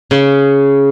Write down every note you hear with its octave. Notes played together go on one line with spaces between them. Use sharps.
C#3